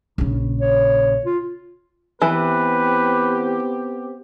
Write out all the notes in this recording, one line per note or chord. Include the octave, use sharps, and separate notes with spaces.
A#1 C#3
C#5
F4
E3 B3 C4 G4 B4